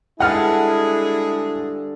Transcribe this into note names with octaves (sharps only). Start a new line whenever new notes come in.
G2 D3 G#3 E4 G#4 F#5 A5 F6